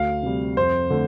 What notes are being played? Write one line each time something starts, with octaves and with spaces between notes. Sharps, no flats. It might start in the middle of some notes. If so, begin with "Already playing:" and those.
Already playing: D2 F5
C3 G3
F2 C5
D3 A3